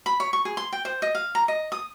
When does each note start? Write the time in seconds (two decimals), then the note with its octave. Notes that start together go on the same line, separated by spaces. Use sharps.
0.06 B5
0.20 C#5
0.33 C#6
0.45 G#4
0.57 C6
0.72 G5
0.85 C5
1.02 D#5
1.15 F5
1.35 A#5
1.48 D#5
1.72 D#6